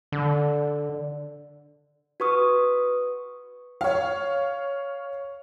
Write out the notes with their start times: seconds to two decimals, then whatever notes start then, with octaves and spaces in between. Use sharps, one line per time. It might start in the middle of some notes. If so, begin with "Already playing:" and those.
0.12 D3
2.20 F#4 B4 C#6 D#6
3.81 C#5 F5